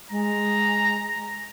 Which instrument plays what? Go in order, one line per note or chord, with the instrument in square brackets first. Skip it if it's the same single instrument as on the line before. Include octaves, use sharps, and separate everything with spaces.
[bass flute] G#3 [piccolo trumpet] A#5